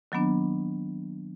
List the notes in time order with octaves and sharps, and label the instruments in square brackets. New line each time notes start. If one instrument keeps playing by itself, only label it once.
[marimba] D#3 F#3 A#3 B3 D4